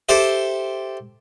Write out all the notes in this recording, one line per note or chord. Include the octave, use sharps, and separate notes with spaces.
G4 A4 C5 E5